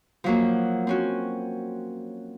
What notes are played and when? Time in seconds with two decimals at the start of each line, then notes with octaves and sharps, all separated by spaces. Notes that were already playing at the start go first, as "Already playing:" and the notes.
0.24 F3 F#3 A#3
0.87 C4 C#4 F#4